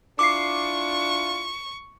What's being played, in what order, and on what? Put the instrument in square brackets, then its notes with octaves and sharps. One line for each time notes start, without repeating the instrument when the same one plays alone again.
[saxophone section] D4 E4 F4 [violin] C#6 [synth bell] D6 C7